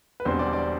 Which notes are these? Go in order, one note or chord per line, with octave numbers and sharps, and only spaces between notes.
B4
E1 E2 D3 G3 C4 C5
D5
D5